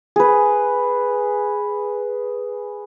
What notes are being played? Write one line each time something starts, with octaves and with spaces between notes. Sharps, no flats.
G#4 B4